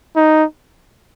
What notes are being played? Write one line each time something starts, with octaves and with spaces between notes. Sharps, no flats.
D#4